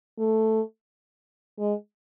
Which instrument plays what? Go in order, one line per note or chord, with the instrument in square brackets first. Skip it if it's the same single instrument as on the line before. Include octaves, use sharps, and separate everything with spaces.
[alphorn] A3
G#3